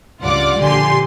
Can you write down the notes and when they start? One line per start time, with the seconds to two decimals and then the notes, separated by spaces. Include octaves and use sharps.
0.21 C#2 G2 F4 D5 F#5 D6
0.59 A#1 D3 G4 G#5 C6